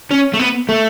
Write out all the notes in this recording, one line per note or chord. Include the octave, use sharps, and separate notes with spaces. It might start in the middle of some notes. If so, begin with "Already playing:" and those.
C#4
A3
B3
A3